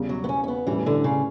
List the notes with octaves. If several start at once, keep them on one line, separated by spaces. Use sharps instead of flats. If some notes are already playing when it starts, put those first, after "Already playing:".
Already playing: E2 C#3 G3
F#3
B3
C#4
C#4
B3
A2 E3 G3 C#4
D3
C#3